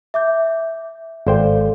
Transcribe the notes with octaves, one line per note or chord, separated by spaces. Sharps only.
E5 D6 G6
G#1 A4 C5 D5 F5 G5